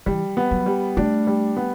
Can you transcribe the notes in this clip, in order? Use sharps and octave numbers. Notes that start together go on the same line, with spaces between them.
E3 G3
B3
F#3
G3
A3 D4
G3
B3